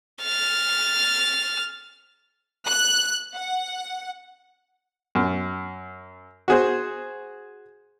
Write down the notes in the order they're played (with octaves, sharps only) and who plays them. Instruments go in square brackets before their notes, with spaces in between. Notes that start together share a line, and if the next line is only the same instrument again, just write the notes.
[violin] F6 A6
[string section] F#6
F#5
[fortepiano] F#2
F#4 G#4 C5